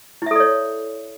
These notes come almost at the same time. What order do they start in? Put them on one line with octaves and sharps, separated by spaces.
E4 E5 A4 D5 C#5